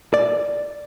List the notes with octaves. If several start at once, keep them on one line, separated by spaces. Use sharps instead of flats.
D5